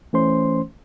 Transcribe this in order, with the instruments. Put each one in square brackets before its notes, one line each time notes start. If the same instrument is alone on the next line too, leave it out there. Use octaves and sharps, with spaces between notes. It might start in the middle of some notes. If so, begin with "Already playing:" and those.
[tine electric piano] E3 A3 C#4 C5 C6